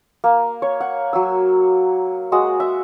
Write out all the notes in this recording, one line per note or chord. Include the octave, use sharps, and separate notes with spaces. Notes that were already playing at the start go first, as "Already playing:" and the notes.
A#3
C#5
F#5
F#3 E6
G#3 F#4 D#6
E5